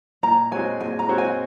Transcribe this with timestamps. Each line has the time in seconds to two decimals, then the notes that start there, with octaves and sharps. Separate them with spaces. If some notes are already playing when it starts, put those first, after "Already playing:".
0.23 A#2 A#5
0.51 G#3 C4 F#4 C#5 G#5
0.80 A#2 G#5
0.99 A#5
1.09 G#3 C4 F#4 C#5
1.18 G#5